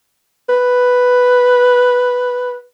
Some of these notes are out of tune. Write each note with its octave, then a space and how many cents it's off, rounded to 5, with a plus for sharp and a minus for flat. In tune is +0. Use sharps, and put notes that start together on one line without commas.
B4 +0